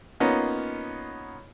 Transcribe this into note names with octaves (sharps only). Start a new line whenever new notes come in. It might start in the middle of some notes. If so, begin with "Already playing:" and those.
A#3 B3 C#4 D#4 F4